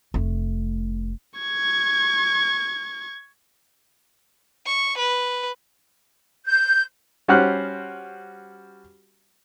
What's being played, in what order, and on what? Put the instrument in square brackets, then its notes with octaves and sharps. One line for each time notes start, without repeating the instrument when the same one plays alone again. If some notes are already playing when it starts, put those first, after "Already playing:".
[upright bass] F1 A3
[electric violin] C#6 G#6
[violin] C#6
B4
[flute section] G6
[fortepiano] G3 C#4 F#4 C5 F6 F#6